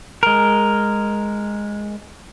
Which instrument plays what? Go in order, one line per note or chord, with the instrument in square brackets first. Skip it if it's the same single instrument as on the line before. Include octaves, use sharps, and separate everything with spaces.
[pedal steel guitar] G#3 A#4